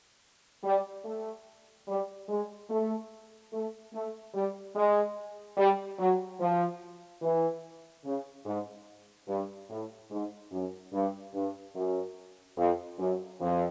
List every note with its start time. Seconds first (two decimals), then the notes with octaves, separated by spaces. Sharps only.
0.64 G3
1.05 A3
1.88 G3
2.29 G#3
2.70 A3
3.53 A3
3.93 A3
4.34 G3
4.76 G#3
5.57 G3
5.99 F#3
6.40 F3
7.22 E3
8.05 C#3
8.46 G#2
9.28 G2
9.70 A2
10.11 G#2
10.52 F#2
10.93 G2
11.34 G2
11.75 F#2
12.57 F2
12.99 F#2
13.40 F2